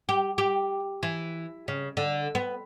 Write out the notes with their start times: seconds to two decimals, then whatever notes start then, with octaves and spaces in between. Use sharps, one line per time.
0.09 G4
0.38 G4
1.03 E3
1.68 C#3
1.97 D3
2.35 B3